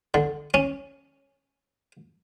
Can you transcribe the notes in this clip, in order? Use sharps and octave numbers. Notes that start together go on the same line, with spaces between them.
D3
C#4